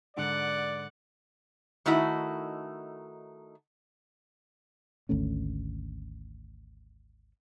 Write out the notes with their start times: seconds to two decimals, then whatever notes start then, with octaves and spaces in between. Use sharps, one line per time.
0.17 G#2 D3 D5 F#5 D6
1.86 D#3 A3 D#4 E4 F#4
5.09 G#1 D2 A3 C#4